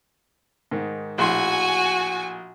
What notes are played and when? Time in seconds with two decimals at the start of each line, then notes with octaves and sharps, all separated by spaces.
0.71 G#2 D#3
1.18 A#1 A2 F#4 G#5 C6